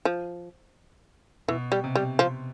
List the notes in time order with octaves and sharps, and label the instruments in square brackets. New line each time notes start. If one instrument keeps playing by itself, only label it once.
[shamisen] F3
[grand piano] B2 [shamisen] E3
[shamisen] G3
[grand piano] C3
[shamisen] G3
[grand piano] C3 [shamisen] F3